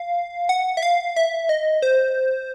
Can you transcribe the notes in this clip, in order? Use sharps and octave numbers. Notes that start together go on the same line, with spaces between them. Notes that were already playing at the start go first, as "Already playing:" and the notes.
Already playing: F5
F#5
E5
F5
E5
D#5
C5